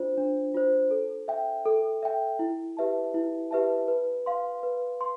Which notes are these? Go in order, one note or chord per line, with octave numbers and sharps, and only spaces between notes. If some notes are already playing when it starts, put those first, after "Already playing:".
Already playing: D4 F4 C5
D4
F4 C5
A4
E5 G5
A4
E5 G5
E4
G4 B4 E5 A5
E4
G4 B4 E5 A5
B4
F5 C6
B4
C6